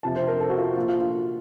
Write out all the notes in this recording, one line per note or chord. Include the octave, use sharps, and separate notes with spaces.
F2 C3 F3 A5
C5
A#4
A4
F#4
F4
A#2 F3 F4
F4
F4